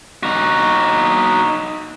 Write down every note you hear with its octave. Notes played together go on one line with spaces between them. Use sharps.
D#4 F#4